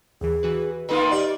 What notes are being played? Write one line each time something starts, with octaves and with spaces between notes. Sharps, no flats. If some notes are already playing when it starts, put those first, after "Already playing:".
D#2 E3 G#4
E3 F#4 B4
D#3 A#3 D#4 F4 A4 B4 E5
G4 D5